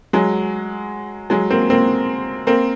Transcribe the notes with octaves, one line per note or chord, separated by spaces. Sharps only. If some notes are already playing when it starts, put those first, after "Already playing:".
F#3 G#3
F#3 G#3
A#3 C4
A#3 C4
A#3 C4